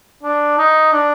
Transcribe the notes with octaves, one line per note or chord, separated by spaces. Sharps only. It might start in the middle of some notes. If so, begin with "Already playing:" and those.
D4
D#4
D4